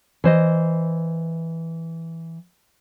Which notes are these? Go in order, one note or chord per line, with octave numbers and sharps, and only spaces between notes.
E3 C5 D#5